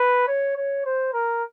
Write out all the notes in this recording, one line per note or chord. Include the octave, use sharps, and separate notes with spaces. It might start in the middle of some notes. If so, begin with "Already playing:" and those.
Already playing: B4
C#5
C#5
C5
A#4